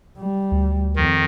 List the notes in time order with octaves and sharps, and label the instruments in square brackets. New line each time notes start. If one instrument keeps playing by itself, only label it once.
[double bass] G3
[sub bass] D2
[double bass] F2 [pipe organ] D#3